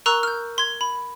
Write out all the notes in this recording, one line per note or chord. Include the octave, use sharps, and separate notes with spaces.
A#4 A#5 C#6 E6 F#6
F6 G6
C6 G#6
B5